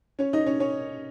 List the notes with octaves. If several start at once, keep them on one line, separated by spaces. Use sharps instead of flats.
C#4 C#5
D#4 D#5
C#4 C#5
C#4 C#5